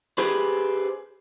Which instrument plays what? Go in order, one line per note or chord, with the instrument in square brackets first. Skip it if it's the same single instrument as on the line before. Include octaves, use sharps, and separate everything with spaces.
[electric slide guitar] G4 G#4 B4 C5